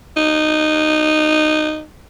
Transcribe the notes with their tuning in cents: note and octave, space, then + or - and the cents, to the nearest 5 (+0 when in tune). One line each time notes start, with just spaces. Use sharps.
D#4 -15